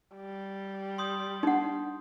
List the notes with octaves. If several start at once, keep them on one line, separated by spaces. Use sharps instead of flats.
G3
C6 D#6 G6
D4 D#4 F#5